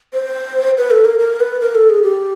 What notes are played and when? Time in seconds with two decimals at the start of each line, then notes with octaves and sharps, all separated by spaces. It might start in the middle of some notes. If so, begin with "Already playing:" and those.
0.14 C5
0.78 B4
0.91 A4
1.05 A#4
1.19 A#4
1.40 B4
1.61 A#4
1.75 A4
1.90 G#4
2.03 G4